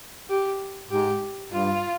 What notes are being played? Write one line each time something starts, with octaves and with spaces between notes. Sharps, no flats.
G4
G#2 G4
G2 F4